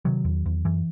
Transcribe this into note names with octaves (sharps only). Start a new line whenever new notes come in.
C3 D#3 F#3
E2
E2
F#2 E3